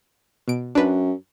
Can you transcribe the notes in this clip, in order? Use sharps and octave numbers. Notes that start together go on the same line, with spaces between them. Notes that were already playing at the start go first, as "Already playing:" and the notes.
B2 D7
F#2 D4 B4